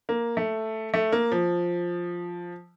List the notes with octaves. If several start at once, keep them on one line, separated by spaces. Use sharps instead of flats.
A#3
A3
A3
A#3
F3